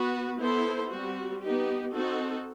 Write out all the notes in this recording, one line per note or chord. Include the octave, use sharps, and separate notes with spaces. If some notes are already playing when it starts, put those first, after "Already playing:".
Already playing: B3 F#4 B4
B3 E4 A4 C5
G3 C4 F#4
B3 D#4 G4
C4 D#4 F#4 A4